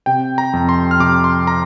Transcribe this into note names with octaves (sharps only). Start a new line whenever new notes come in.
C3 G5
A#5
F2
C6
F6
C3 D6
C6
A#5